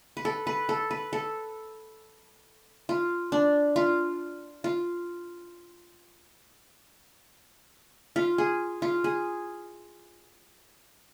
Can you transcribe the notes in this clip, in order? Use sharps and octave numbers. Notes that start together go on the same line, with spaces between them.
B4
A4
B4
A4
B4
A4
F4
D4
F4
F4
F4
G#4
F4
G#4